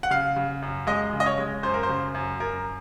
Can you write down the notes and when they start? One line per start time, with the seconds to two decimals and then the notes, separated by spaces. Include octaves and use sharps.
0.03 F#5
0.10 C#3 F5
0.36 C#3
0.62 F#2
0.87 G#3 D#5
1.13 C#3
1.20 D#5
1.26 C#5
1.38 G#3
1.63 F#2 C5
1.74 A#4
1.83 C5
1.89 C#3
2.14 F#2
2.40 F#2 A#4